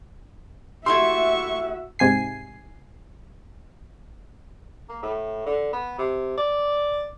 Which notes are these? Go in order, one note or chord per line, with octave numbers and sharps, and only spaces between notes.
A3 E4 F#4 G4 E5 C6 C#6
G#2 C3 G#5 C7
A#3
A2
D3
B3
C3
D5